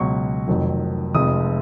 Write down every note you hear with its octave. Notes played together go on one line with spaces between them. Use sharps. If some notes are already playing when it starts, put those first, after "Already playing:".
Already playing: C#2 B2 F#3 C#6
F1 F2 D#3 F#3
F1 F2 F3 G#3 D#6